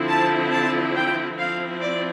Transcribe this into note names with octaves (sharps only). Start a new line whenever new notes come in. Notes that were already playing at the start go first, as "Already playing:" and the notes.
Already playing: D3 F3 C4 E4
A5
A5
G5
F3 C4 E4 F5
D5